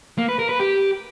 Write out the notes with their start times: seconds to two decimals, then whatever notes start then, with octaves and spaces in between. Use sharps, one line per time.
0.18 A#3
0.28 B4
0.39 A#4
0.49 B4
0.59 G4